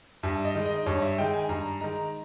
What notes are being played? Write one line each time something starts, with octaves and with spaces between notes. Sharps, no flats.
G2 E5
D#5
D#3 G#3
D#5
G2 C#5
E5
D#3 G#3 G5
G#5
G2 A#5
D#3 G#3 A#5